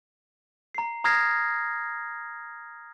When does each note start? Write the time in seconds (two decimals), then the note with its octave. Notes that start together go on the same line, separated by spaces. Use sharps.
0.75 A#5 C7
1.04 A#5 D#6 F6 G#6 A#6 C7